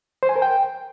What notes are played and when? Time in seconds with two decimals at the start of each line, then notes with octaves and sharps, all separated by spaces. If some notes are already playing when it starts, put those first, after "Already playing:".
0.23 C5
0.29 G#5
0.36 A#4
0.42 G5